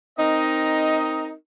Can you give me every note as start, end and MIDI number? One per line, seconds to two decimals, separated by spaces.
0.18 1.30 60
0.18 1.30 63
0.18 1.30 70
0.18 1.30 75